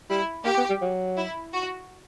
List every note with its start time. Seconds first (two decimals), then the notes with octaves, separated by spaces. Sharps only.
0.10 G3 E4
0.45 A#3 G4
0.58 B3
0.70 G3
0.81 F#3
1.17 E4
1.53 F#4